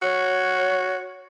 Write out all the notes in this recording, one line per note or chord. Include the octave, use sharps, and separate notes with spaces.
F#4 C#5